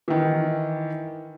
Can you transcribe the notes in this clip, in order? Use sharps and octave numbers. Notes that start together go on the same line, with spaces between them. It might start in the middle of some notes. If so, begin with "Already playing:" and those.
D#3 E3